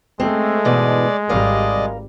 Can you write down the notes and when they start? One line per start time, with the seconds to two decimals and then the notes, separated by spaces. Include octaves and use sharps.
0.20 G#3 A3 C4
0.65 G#2 B2 E3 D5
1.29 G#1 G3 A#4 D5 D#5 F5